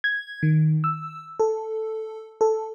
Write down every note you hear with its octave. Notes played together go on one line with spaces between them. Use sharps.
G#6
D#3
E6
A4
A4